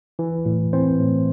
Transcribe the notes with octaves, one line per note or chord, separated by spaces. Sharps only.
E3
A2
E3 C4 C5
A2